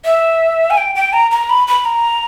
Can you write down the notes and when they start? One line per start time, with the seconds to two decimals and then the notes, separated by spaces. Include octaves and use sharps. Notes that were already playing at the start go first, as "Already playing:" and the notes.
0.05 E5
0.70 G#5
0.77 G5
0.95 G5
1.13 A#5
1.31 A#5
1.50 B5
1.67 B5
1.85 A#5